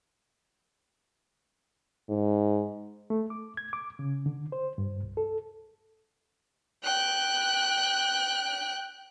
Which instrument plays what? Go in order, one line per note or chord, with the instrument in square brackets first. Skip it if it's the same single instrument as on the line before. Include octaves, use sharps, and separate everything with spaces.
[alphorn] G#2
[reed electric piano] A3
D6
G#6
D6
C#3
D3
C5
G2
C2
A4
[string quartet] G5 F#6